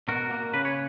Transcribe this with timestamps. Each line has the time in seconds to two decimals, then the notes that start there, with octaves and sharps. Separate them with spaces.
0.08 B2 F#4 A#4
0.31 A#3
0.53 C#3 B4
0.65 C#5